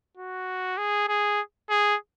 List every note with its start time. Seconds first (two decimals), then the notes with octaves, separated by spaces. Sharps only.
0.17 F#4
0.78 G#4
1.09 G#4
1.70 G#4